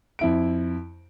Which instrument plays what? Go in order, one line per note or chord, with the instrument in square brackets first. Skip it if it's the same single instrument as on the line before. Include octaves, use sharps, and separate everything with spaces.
[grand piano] F2 E4 D7